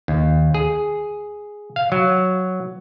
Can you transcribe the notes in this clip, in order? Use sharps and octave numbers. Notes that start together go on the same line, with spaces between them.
D#2
G#4
F5
F#3